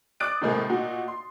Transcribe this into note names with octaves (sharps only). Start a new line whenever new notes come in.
D6 D#6 F#6 A6 D7
A2 C3 D#3 G#3 A#3
A#2 D#4 F#4
C6